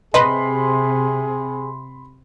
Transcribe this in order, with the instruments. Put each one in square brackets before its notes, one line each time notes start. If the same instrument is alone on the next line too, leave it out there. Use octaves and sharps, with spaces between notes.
[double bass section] C3 [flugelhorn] G#4 [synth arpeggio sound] B4 D#5 [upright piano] B5 C6